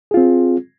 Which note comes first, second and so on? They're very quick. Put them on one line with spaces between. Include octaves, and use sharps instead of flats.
G#4 F4 C4